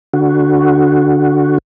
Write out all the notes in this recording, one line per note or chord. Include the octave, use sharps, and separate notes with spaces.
D3 F#4